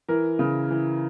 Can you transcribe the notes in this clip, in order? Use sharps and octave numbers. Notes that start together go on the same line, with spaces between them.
E3 A#4
C#3
E3